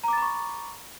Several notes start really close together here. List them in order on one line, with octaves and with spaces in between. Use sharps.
A#5 D6 A6 B5 C#6